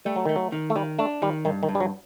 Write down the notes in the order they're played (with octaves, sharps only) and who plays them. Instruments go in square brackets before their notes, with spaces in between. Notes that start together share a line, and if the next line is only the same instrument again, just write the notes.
[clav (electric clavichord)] G3 [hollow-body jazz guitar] A3
[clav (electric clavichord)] F#3
[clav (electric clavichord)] D#3 [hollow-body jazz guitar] A3
[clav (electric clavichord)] F#3
[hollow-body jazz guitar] D#3
[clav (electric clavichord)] A3
[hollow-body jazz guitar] D#3 [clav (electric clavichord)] G3
[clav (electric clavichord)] A3 [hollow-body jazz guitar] D4
[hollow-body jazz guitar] D#3 [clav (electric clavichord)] G3
[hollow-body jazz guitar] G2 [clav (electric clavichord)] D#3
[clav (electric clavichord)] D#3
[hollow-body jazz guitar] G2
[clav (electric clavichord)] G3
F#3